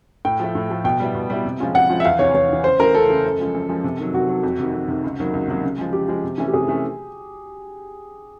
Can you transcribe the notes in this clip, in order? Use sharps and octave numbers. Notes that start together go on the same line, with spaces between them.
A2 G5
F3 A3
A2
F3 A3
B2 G5
G3 B3 E4
B2
G3 B3 E4
C3
F3 G#3 C#4 F4
C3 F#5
F3 G#3 C#4 F4
E5
E2 F5
C3 E3 C#5
E2 C#5
C3 E3
C#2 C5
C#3 E3 A3 A#4
C#2 A4
C#3 E3 A3
F#2
C#3 F3 G#3
F#2
C#3 F3 G#3
C3
D#3 F#3
C3 F#4
D#3 F#3
F2
C3 D#3
F2
C3 D#3
C#2
C3 D#3 F#3 A#3
C#2
C3 D#3 F#3 A#3
C#3
F3 G#3
C#3 G4
F3 G#3
C3
E3 A3 C#4
G4
C3 G#4
E3 A3 C#4